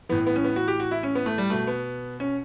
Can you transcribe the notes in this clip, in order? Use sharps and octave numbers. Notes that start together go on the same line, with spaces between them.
A2 E3 B3
B3
C#4
B3
F#4
G4
F#4
E4
C#4
B3
A3
G3
B2 A3
B3
C#4